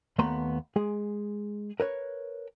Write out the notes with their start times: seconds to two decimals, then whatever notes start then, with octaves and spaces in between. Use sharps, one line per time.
0.18 D#2 A3 B3 B4 A#5 C6
0.76 G#3 G#4
1.80 A#4 B4 C#5